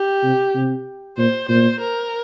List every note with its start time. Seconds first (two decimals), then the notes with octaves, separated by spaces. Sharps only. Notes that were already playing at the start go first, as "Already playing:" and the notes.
Already playing: G4
0.23 C3
0.55 C3
1.18 A#2 C5
1.49 A#2 C5
1.81 A#4